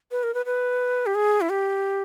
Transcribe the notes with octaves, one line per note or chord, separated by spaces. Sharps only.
B4
A#4
B4
B4
G4
G#4
E4
G4